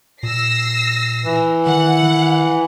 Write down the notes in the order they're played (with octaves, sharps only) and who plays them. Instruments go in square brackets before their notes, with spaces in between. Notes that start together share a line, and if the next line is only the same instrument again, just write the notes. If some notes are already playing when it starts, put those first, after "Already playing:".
[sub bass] A#2 [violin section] E6 A#6 C7
[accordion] E3
[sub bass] D#3 [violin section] F#5
[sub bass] D#3